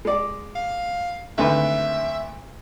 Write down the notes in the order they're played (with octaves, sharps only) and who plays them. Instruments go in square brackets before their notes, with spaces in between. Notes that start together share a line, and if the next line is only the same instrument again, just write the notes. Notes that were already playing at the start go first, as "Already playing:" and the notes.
[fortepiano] G#3 D5
[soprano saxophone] F5
[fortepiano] G#1 D2 B4 [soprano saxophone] E5